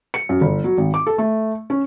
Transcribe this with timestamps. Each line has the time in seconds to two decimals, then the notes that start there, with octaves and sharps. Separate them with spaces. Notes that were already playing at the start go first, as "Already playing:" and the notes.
0.14 C#7
0.29 F#2
0.41 G1
0.64 F#3
0.78 G#1
0.94 D6
1.07 A4
1.18 A3
1.70 C#4